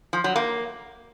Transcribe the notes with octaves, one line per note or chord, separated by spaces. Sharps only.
F3
F#3
A#3